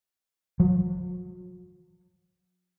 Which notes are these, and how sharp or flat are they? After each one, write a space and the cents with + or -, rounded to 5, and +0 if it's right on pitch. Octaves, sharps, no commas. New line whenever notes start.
F#3 -40